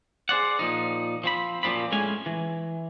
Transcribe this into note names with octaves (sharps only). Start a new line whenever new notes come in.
G#4 C5 D5 F#5
A#2 F3 D#4
F3 C4 B5
F#2 A#2 F3 C4 B5
A2 G#3 C#4 G#5
E3